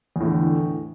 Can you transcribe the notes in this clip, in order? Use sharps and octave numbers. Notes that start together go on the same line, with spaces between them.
E2 A2 D3